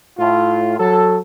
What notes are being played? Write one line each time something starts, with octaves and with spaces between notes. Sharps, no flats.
A2 F4
F#3 A4